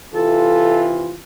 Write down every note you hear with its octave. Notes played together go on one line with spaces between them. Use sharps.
C3 E3 F4 A4